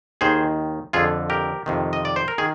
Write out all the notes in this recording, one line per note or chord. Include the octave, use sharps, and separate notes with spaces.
D#2 D#3 G#4 C5
F2 D3 F4 G#4
G4 A#4
F2 C3 D#3
D#5
D5
C5
A#4
D#3 G#4